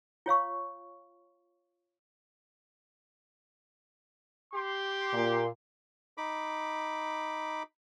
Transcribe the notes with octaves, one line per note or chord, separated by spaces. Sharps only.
F4 C#5 F5 C#6
G4 C6
A#2
D#4 B5 D6